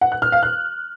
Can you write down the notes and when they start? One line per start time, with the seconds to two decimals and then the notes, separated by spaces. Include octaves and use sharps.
0.01 F#5
0.12 F#6
0.22 F6
0.32 F5
0.43 F#6